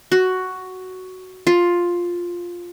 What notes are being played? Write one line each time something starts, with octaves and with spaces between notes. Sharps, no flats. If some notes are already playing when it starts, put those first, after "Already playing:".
F#4
F4